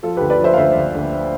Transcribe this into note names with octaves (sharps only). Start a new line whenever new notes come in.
F3 F4 A4
D2 G4 B4
B4 D5
F3
C5 E5
F5
D2 C5 E5
D2
D2